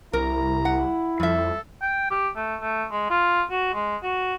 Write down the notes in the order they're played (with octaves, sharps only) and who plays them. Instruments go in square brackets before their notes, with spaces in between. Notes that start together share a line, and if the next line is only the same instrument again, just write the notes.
[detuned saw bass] C2 [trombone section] E4 [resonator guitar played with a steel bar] A#4 [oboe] A#5
[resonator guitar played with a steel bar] F#5
[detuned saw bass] F2 [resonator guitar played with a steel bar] G3 E5 [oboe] A4
[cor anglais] G5
G4
A3
A3
G#3
F4
F#4
G#3
F#4